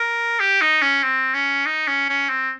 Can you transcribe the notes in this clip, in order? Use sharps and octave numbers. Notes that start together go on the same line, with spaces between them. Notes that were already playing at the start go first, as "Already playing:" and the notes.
Already playing: A#4
G4
D#4
C#4
C4
C#4
D#4
C#4
C#4
C4